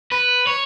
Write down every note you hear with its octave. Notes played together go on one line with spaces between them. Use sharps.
B4
C#5